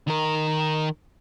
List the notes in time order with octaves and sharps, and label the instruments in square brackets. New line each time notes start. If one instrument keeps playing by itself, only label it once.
[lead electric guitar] D#3 A#4